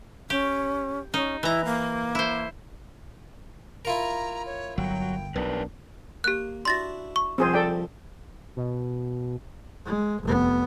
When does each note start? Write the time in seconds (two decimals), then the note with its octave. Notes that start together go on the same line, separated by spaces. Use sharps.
0.30 C#4 G4
1.14 C#4 D#4
1.43 E3 E4 A#5
1.65 A#3
2.15 E4 C5
3.85 E4 F4 A#4 A#5
4.46 C#5
4.78 G1 F#3 G5
5.36 B1 D4 A#4 B4
6.24 A#3 G4 F#6
6.65 D4 E4 F#4 C6 A6 A#6
7.16 C#6
7.38 C2 F2 F3 C4 G#4 C5
7.54 A4 D5 G5
8.56 B2
9.85 G#3
10.23 F1 B3